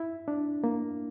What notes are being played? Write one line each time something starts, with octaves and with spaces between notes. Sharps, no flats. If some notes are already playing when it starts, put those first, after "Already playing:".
Already playing: E4
D4
A#3